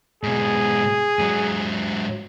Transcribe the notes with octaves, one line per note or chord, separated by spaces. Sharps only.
G#2 B2 G#4
G#2 F#3